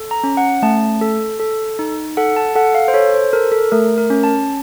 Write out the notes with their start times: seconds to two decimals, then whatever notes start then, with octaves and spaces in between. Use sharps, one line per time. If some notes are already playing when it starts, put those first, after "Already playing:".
Already playing: A4
0.11 A#5
0.24 C#4
0.37 F#5
0.62 A3 A5
1.01 A4
1.40 A4
1.79 D#4
2.17 A4 F#5
2.37 A5
2.55 A4 F#5
2.75 F5
2.88 C5
2.94 A4 C#5
3.14 C5
3.33 A4 A#4
3.52 A4
3.72 A3 A#4
3.98 A#4
4.10 C#4
4.24 A5